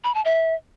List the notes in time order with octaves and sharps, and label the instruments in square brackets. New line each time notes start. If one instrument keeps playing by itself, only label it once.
[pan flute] B5
A5
E5